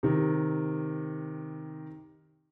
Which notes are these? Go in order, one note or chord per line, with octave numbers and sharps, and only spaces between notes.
C3 D#3